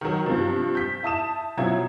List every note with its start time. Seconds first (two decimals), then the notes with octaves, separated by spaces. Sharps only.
0.01 D#3 F#3
0.26 G2 C3 F3
0.75 G6 B6
1.03 E4 A5 D#6 E7
1.57 B2 F3 F#3 C#4 E4 G#6